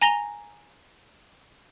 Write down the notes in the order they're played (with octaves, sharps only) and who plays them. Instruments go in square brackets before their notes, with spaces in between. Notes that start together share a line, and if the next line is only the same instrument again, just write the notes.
[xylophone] G#5 A#5 A#6 F7 G7